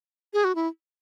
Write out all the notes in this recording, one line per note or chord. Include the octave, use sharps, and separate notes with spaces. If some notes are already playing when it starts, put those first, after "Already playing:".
G#4
F#4
E4